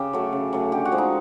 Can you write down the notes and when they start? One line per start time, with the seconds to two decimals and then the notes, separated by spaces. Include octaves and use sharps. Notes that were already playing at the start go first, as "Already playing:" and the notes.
Already playing: C#3 G4
0.13 F#3 A3
0.33 C#3
0.53 F#3 A3
0.72 D3 G4
0.85 F#4
0.92 F3 G#3
0.98 D#4